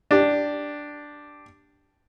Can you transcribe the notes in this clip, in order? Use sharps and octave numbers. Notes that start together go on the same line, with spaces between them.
D4 G4